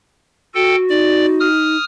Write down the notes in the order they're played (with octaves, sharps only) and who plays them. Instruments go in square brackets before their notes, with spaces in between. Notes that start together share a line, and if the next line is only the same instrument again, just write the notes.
[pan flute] F#4 [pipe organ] A4 G5
[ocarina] D#4 [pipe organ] D5
[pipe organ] D#6 F6